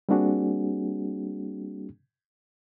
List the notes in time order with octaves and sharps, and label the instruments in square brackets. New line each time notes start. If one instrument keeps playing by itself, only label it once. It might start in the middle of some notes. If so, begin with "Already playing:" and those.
[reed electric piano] G3 A#3 C4 D4 F#4 G#4